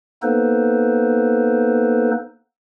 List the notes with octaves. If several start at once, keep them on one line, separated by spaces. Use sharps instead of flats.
A#3 B3 D#4 A4 B4 C5